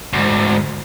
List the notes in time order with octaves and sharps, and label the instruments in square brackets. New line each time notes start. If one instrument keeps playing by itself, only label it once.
[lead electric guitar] D2 G#2